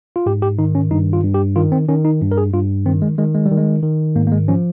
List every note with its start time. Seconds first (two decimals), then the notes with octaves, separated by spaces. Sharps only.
0.16 F4
0.26 G#2 G4
0.42 G4
0.59 D#3 D#4
0.75 C#4
0.91 G2 D#4
1.13 F4
1.24 G2
1.34 G4
1.56 D#3 F4
1.72 C4
1.88 D#3 C#4
2.05 D#4
2.21 G2
2.32 A#4
2.37 G#4
2.53 G2 F4
2.86 D#3 C4
3.02 G#3
3.18 D#3 G#3
3.35 G#3
3.46 G3
3.51 D#3
3.57 G#3
3.83 D#3
4.16 G#2 A#3
4.27 A#3
4.32 G#3
4.48 F3 C#4